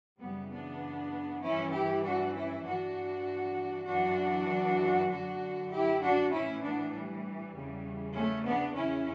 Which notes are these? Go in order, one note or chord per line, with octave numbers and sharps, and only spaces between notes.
F#2 C#3 E3 G3 B3
B3 D4
G2 E3 C#4 E4
E4 G4
D4 F#4
C#4 E4
G2 E3 D4 F#4
F#2 E3 D4 F#4
F#2 D3 D4 F#4
E4 G4
D4 F#4
A2 E3 C#4 E4
B3 D4
G3
E2 C#3 E3
A3 C#4
B3 D4
E2 C#3 E3 C#4 E4